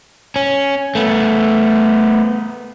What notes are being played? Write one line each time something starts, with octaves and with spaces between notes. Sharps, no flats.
C#4
A3 B3